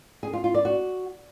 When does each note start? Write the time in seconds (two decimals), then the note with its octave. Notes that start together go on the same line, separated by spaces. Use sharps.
0.23 G#4
0.33 F4
0.44 F4
0.54 D5
0.65 F#4